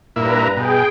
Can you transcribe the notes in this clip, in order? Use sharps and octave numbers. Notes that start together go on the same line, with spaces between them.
G2 A#2 E4 B4 A#5
B2 G#4 G5